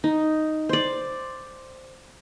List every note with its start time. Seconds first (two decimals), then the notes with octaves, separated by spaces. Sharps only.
0.04 D#4
0.69 C5 D5